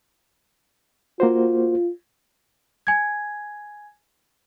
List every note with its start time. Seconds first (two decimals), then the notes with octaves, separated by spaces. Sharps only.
1.20 A#3 F4 F#4 C5
2.87 G#5 G#6